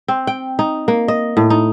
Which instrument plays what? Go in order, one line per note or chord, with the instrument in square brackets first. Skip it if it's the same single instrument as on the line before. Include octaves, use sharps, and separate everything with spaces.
[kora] C4
G5
D#4
A#3
D#5
A2
D#4